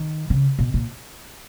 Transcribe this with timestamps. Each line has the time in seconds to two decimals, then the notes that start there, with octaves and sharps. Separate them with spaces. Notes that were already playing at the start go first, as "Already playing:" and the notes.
Already playing: D#3
0.30 C#3
0.59 B2
0.74 A#2